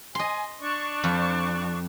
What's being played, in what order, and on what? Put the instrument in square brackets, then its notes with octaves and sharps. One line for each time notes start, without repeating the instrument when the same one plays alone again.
[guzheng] D#5 C6 [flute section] G#5
[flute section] D4 C#6
[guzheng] F2